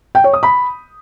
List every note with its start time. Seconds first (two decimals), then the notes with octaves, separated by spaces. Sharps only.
0.15 G5
0.24 C#5
0.33 D#6
0.43 B5